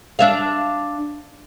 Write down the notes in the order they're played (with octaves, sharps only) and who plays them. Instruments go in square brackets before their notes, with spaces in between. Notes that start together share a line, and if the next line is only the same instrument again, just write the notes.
[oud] D4 E5 F5